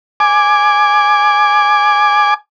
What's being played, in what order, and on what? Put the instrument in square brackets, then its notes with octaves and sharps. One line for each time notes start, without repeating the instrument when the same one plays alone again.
[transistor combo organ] G#5 D6